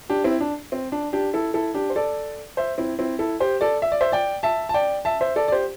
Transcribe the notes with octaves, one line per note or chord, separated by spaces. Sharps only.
D4 G4
C4 E4
D4
C4
D4
D4 G4
E4 A4
E4 A4
D4 G4
C5
A4 D5
C5 E5
C4 E4
C4 E4
E4 A4
G4 C5
A4 D5
E5
D5
C5 E5
D5 G5
E5 A5
A5
D5 G5
E5 A5
C5 E5
A4 D5
D5
G4 C5